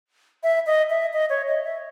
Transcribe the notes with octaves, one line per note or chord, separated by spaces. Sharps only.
E5
D#5
E5
D#5
C#5
D#5
E5